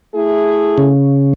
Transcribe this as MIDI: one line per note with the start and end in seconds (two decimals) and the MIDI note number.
0.14 0.92 57
0.14 0.92 64
0.14 0.92 68
0.78 1.34 49